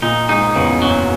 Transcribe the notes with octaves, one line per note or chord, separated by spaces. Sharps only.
A#2 D#4
G#2 D#4
E2 C#3
F#2 F#3